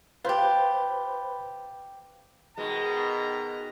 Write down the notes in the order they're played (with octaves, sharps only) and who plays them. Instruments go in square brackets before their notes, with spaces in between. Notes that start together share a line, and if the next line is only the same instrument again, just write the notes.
[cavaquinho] F4 G4 [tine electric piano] B4 C5 B5
[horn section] B2 D#3 A#5 [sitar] G#3